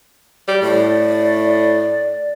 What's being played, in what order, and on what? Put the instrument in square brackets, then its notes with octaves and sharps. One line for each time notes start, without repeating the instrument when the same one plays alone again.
[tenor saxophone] G3
[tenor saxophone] A2 [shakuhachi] D5